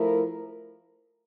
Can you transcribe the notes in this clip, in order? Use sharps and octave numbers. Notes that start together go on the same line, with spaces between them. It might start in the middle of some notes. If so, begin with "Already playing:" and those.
Already playing: F3 A3 E4 A#4